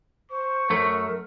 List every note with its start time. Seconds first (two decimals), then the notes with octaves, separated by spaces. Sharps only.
0.31 C5 C#6
0.70 F#2 A3 A#4